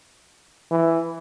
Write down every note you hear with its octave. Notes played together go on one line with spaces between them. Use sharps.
E3